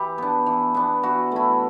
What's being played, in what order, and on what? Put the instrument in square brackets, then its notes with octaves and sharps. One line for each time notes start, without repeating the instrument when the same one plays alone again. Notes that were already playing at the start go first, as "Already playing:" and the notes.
Already playing: [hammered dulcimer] E3 G4
B3 D4
E3
B3 D4
E3 F#4
A3 E4